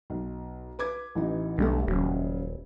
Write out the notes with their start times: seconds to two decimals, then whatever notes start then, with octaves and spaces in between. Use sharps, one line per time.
0.10 B1
0.79 B4 D6 G#6
1.15 A1 E3 D#4
1.58 B1 D3 G3 A3
1.88 D#1 C#3 F#3